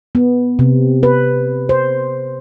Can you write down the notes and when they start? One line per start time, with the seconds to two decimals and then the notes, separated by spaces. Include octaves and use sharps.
0.15 B3
0.59 C3
1.03 B4
1.69 C5